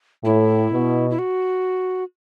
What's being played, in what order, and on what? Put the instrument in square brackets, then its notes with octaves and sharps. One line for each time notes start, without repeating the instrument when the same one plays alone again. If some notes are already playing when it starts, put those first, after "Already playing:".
[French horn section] A2 [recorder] E4
[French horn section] B2
[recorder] E4
F#4